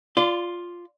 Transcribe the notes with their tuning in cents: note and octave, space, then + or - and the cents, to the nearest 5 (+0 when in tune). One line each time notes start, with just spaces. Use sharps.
F4 +0 D5 +0 C6 -30